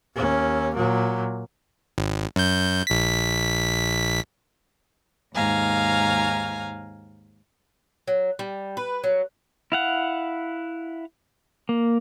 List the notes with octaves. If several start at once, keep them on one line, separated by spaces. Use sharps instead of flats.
D#2 C#4
A#2 F#3
G#1
F#2 G6
A#1 B6
D#2 G#2 F5 G#5 A#5
F#3
G3
B4
F#3
E4 F5 F#5
A#3